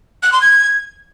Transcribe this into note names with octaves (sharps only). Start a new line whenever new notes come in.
F#6
C6
G#6